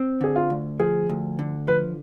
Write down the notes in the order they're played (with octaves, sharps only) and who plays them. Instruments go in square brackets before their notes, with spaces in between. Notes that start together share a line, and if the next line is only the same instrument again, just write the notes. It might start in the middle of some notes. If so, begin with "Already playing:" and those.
Already playing: [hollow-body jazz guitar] C4
[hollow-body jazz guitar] D3 [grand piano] G#4
[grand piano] F4
[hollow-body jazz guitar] D2
[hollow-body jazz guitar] F3 [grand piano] G#4
[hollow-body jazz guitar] D2
D3
[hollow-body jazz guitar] F3 [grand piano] B4